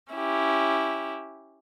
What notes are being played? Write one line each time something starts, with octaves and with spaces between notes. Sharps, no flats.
C#4 E4 G4